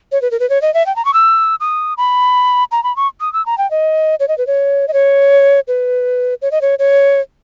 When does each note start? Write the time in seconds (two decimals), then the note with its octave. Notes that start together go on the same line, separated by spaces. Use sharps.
0.12 C#5
0.22 B4
0.31 A#4
0.40 B4
0.50 C#5
0.62 D#5
0.74 E5
0.86 G5
0.96 A#5
1.05 C#6
1.14 E6
1.60 D#6
1.97 B5
2.71 A#5
2.84 B5
2.96 C#6
3.21 D#6
3.33 E6
3.46 A#5
3.58 G5
3.71 D#5
4.20 C#5
4.28 D#5
4.38 B4
4.47 C#5
4.88 D#5
4.93 C#5
5.68 B4
6.42 C#5
6.51 D#5
6.61 C#5
6.79 C#5